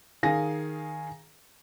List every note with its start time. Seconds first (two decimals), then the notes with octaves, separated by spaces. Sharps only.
0.23 D#3 G#4 F5 G#5 A#6